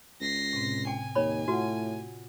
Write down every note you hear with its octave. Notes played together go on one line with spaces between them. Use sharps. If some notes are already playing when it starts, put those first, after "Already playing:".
C#2 A#6 C7
A2 C3 C4
G5 G#5
D#2 C#5 B5
A2 F4 F#4 F#5